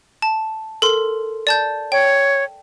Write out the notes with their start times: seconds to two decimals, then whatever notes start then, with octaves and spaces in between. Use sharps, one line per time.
0.22 A5
0.82 A4 A#4 C6
1.47 D5 A5 G6
1.92 C#5 G5